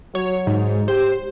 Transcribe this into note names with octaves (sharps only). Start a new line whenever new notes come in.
F#3 C#5
G#2
G4 C5